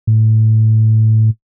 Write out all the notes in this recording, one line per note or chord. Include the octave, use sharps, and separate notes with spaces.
A2